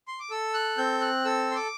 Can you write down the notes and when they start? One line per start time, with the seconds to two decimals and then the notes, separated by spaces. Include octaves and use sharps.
0.08 C6
0.20 D6
0.31 A4 E6
0.54 F#6
0.78 C4 G6
1.01 F#6
1.25 A4 E6
1.51 C6
1.55 D6